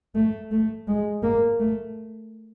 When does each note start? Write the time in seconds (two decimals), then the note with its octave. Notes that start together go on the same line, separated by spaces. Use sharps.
0.15 A3
0.51 A3
0.88 G#3
1.23 A#3
1.60 A3